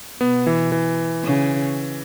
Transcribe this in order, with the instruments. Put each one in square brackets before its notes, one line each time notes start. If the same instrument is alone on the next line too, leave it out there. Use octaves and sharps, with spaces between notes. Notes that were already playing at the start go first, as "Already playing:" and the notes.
[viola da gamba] B2 [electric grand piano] B3
[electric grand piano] E3
E3
[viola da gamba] C#3